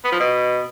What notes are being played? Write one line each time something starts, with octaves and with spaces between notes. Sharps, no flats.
B3
F3
B2